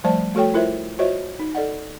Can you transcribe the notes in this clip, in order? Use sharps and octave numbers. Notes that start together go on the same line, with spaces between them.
F3 G3 A3 C5 D5 A5
A3 F#4 A4 C#5 G5
E4 F4 A#4 C5 E5
F4 F#4 C5 C#5 D#5 E5
D#4
A4 D5 D#5 F#5